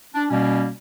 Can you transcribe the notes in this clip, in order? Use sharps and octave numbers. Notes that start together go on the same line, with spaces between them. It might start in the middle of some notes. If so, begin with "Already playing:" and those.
D4
B2 G3 A#3 C#4